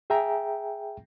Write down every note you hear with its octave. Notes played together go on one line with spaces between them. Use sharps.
G#4 E5 G5 G#5 A#5